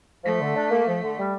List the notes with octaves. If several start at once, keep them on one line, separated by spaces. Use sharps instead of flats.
F3 A3
D3
D4
A#3
F3
D3
G3